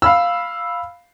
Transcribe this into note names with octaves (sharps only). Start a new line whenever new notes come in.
F5 B5 E6